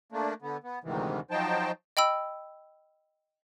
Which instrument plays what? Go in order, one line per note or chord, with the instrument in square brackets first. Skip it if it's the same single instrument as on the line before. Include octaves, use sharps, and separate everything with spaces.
[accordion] A3 A#3 D4
D3 B3
B3
D2 G#2 C3 D#3 E3
F3 F#3 D#4 C5 G5 A5
[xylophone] D#5 G5 B5 E6